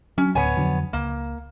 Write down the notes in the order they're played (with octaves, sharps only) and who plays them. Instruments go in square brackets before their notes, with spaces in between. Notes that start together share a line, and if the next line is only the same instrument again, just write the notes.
[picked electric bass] F#3 [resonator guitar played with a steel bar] C#4
[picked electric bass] D1 [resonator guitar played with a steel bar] B3 C#5 G#5
[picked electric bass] F2 D3 F#3
[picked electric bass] C#2 [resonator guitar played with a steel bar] A#3